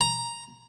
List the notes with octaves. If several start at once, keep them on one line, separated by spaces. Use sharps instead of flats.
A#5